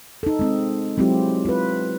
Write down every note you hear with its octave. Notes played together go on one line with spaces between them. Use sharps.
D#4 A4
G#3 C4
F#3 G#3 C4 E4 F4 G4
F4 B4